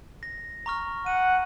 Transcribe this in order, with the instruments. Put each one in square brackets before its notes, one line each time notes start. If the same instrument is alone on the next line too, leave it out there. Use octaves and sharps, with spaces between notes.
[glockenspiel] A#6
A#5 C#6 F6
[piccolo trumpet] F#5 [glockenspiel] D#7